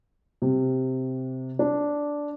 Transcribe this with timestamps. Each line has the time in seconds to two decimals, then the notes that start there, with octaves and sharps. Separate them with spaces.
0.42 C3
1.59 D4